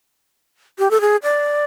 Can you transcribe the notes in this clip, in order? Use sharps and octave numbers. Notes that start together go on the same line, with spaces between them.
G4
A4
G#4
D5